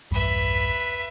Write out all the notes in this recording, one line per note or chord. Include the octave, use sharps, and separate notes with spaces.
B1 E2 G2 B4 E5